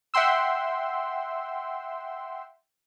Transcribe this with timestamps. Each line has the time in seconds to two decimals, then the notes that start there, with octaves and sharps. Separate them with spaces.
0.14 E5 F#5 G5 C6 E6